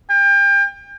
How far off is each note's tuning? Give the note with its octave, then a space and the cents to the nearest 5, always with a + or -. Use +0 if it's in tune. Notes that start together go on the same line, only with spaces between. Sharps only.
G5 +30